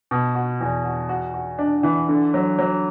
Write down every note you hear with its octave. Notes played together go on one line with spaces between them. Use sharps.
B2
F#4
E2
F#4
F#4
F#4
D4
E3
D3
F#3
F#3